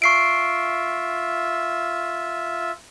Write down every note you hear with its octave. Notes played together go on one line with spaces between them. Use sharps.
F4 E5 C#6 C7 D7